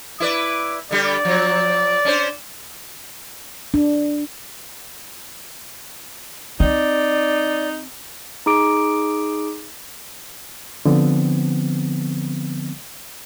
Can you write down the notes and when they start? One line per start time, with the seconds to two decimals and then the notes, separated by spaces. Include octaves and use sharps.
0.20 E4 B4 D5 D6
0.91 D3 G3 G4 D5
1.25 F3 F#3
2.05 C#4 D4 C5
3.74 D4
6.60 C4 D#4 D5
8.46 D#4 G#4 D6 D7
10.85 D3 F3 B3 C4